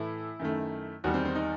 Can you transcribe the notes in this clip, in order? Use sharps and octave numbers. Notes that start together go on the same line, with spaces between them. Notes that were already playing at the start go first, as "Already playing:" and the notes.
Already playing: A2 E3 A3 E4
F#2 D#3 A3
E2 D#3 G3 F#4
C4
C4
D#4